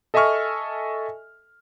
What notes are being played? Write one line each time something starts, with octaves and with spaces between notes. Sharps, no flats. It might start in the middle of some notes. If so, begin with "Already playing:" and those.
A4 D#5 E5 G#5 C#6 F6